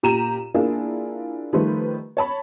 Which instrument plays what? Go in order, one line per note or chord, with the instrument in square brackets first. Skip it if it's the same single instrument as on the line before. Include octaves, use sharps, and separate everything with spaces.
[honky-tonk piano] A#2 G4 A#5 D#7 E7
A#3 D4 E4 F4 G#4 A#4
D#3 F3 G3 A3 B4 C5
C#5 A5 B5